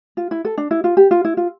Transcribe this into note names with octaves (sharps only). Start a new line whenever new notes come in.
F4
E4
A4
D4
E4
F4
G4
F4
E4
F4